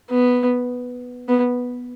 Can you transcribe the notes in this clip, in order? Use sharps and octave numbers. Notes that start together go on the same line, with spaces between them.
B3
B3